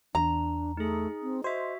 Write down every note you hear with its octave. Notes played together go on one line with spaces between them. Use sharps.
E2 D4 A#5
A3 D#4 G#4
C4
F#4 C5 D#5 E5